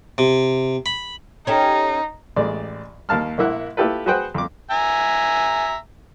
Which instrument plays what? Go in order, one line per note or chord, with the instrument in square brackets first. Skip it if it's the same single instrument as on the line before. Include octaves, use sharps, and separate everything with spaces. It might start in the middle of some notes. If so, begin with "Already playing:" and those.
[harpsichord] C3
B5
[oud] C#4 G4 A4 [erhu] D#4
[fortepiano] A1 G#3 D5
D#2 F5 A5 F6
A#1 A#3 E4 F#5
A3 E4 F4 G4 A4 B4
F#4 G#4 B4 C5 F#5 G5
F2 D6
[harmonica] E5 G#5 A#5